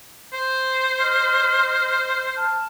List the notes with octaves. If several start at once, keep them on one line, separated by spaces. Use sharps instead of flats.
C5
D#5 C6 F6
A5 F6